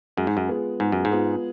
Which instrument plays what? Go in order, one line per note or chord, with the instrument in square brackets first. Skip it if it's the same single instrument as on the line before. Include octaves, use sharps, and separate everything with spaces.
[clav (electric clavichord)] F#2 [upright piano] G#3
[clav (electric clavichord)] G#2
F#2
[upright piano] B3 F4 G#4
[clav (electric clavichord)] G#2 [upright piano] G#3
[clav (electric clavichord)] F#2
G#2
[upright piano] B3 F4 G#4